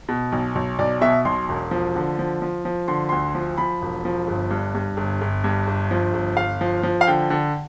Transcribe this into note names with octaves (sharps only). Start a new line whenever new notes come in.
B2
B1
B1
B1 D5
B2 E5
B1 C6
E1
F3
D3
F3
F3
F3
D3 C6
D2 C6
F3
F3 B5
E1
F3
G1
G2
G2
G1
G1
G2
G1
F3
G1
G1 F5
F3
F3
F5
D3 G5
D3